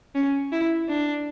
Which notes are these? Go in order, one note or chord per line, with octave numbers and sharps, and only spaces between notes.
C#4
E4
D4